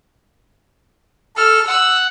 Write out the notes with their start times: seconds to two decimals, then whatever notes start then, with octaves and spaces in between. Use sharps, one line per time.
1.37 A4 F6
1.68 F#5 E6